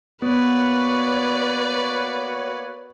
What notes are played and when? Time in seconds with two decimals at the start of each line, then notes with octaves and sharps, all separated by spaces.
0.22 A#3 B3 F#4 B4 C#5 D5